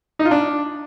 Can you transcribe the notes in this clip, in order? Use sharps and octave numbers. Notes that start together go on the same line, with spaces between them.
D#4
F4
D4